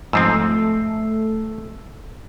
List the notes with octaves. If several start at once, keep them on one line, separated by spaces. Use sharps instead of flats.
G#2 F3 A3 C4 E6 C7